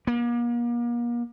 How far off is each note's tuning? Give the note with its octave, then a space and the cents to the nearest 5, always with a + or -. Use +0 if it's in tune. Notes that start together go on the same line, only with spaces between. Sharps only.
A#3 +40